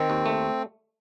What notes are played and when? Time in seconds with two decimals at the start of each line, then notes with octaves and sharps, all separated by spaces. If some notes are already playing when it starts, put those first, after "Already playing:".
Already playing: D#3 C4
0.10 D#2
0.26 A3